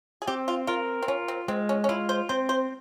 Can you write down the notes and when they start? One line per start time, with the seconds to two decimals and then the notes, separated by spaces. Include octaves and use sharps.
0.22 G#4
0.27 C4 G4
0.48 F4
0.67 F4 A#4
1.02 C4
1.08 C#4 F4
1.28 C4
1.48 G#3 C4
1.69 C#4
1.84 C#4
1.89 E4 F4
2.09 C5
2.29 C4 C5
2.49 C5